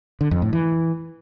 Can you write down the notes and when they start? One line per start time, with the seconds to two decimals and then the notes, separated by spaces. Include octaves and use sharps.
0.21 D3
0.31 F2
0.42 A2
0.53 E3